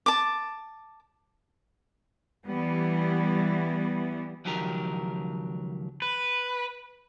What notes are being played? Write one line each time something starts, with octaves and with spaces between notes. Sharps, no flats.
A5 D6
E3 G3 B3
C#2 D#3 F3 F#3 G4 A#4
B4